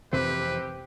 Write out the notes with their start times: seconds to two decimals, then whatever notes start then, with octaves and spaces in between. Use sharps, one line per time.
0.13 F2 C3 E3 C4 G4 B4